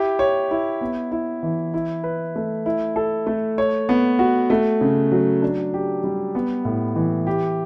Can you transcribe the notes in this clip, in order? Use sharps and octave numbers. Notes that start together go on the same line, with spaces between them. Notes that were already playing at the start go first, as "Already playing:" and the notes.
Already playing: E4 G4
C#5
E4
B3
E4
E3
E4
B4
A3
E4
A4
A3
C#5
B3
F#4
A3
C#3
F#3
D4
G4
G3
B3
A2
E3
G4